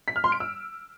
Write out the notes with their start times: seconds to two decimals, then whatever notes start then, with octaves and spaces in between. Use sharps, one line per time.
0.08 B6
0.16 F6
0.24 C6
0.32 D7
0.40 E6